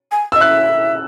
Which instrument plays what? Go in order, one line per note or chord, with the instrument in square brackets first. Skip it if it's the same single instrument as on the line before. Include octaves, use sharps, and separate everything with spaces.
[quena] G#5
[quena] D#5 [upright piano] E6
[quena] E5 [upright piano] F#6